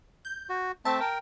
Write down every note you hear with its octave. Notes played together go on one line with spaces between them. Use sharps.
G6
F#4
A3 C4 E5 A5
A#4 G5